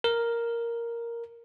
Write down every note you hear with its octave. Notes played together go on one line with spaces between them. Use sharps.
A#4